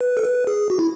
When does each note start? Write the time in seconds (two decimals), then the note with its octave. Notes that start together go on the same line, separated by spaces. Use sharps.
0.01 B4
0.17 A4
0.24 B4
0.47 G#4
0.70 F#4
0.79 E4